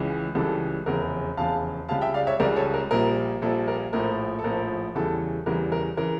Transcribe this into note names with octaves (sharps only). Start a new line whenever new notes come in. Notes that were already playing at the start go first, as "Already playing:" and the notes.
Already playing: C#2 C#3 E3
C#2 C#3 E3 G3 A4
F1 E2 C#3 A#4
F1 E2 C#3 F5 A5
C#2 C#3 G3 F5 A5
E5 G5
D5 F5
C#5 E5
C#2 C#3 G3 A#4 D5
A4 C#5
A#4
A#1 A#2 G3 A#4
A#1 A#2 G3 A4
A#4
A#1 A2 F3 A#4
A4
A#1 A2 F3 A#4
E2 C#3 E3 G3 A4
E2 C#3 E3 G3 A#4
A#4
C#3 E3 A#4